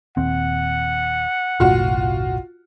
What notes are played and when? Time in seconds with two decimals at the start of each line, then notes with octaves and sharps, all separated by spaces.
0.17 D#1 D#2 C4 F#5
1.60 F#1 B1 A2 F4 F#4